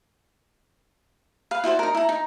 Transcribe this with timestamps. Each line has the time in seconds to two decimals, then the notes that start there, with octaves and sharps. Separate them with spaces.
1.51 B4 F5
1.64 E4 F#4 C5 D5
1.79 D#4 A#4
1.95 E4 A#5
2.09 D#4